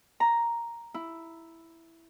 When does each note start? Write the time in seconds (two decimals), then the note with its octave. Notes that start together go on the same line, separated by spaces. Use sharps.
0.20 A#5
0.94 E4